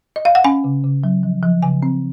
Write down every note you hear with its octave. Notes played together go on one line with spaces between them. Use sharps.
D#5
F5
F#5
C#4 G#5
C#3
C#3
F#3
F3
F3
C#3 G#5
C4